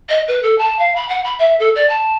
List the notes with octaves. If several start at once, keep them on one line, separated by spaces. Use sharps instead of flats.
D#5
B4
A4
A5
F5
B5
F#5
B5
E5
A4
D5
A5